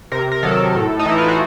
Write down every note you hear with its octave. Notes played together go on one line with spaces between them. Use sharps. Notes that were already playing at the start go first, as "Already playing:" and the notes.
C3 A#4
A#4
D#3 F#3 A4
A2
D#4
E3 E4
F4
F#4